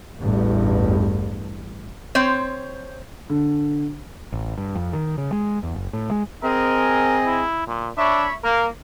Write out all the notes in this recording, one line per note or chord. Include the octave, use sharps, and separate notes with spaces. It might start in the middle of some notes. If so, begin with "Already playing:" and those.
A1 E2 G2
C4 C5 C#5
D3
A1
G2
F2
D#3
C#3
G#3
E2
F#1
A2
G#3
C4 G#4 A#4 D#5
E4
A#2
D4 C#5 E5 B5
A#3 A#4